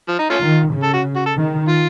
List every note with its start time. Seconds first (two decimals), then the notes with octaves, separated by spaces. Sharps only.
0.08 F3
0.19 D#4
0.30 A3 C#4 F4
0.41 D#3
0.72 C#3
0.83 A4
0.93 F#4
1.16 F#4
1.26 A4
1.36 D#3
1.68 F4